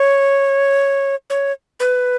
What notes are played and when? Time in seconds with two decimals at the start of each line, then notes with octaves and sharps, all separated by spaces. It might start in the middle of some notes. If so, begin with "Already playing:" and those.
Already playing: C#5
1.30 C#5
1.80 B4